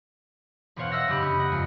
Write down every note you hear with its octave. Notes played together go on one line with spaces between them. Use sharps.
E1 B2 C5 C#5 F5 F#5
D#5 E5 F#5 E6 F6 A#6
F#2 C#3 D4 G4 B5
C#3 C#4 D#6
A#3 D#5 F#5
F2 G#3